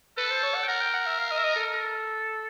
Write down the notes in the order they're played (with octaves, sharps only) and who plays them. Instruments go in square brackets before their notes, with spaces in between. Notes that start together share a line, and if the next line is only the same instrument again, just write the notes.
[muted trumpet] A4 [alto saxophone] B4
[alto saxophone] C5
C#5
F#5
G5
[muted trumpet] A#4 [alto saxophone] F#5
[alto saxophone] G5
F#5
E5
F5
D#5
E5
D#5
A4